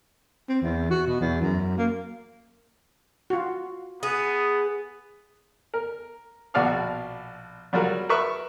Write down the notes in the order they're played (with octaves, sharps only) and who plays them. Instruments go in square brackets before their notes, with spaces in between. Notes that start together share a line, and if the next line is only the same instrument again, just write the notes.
[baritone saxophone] C4
E2
F#4
B2
E2
F#2
A#3
[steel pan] F4 F#4
[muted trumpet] B3 [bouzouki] G#4
[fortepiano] A#4
A#1 B2 F#4 D5 F5 F6
F#3 G3 F4 F#4 A#4
A#4 B4 E5 C#6